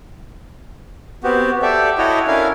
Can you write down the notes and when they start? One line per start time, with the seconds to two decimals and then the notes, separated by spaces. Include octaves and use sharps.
1.24 B3 C4 F#4 G4
1.62 G4 A4 D5 E5
1.98 E4 F#4 A4 C#5 D#5
2.27 C#4 D4 E4 A#4 F5 G#5